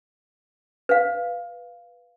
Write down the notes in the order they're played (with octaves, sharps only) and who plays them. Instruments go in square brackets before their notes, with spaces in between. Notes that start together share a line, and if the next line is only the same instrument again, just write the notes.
[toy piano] B4 F5